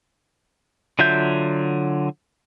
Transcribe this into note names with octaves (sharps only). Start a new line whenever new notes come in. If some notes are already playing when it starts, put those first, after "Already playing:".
D3 F#3 F4 E5 G6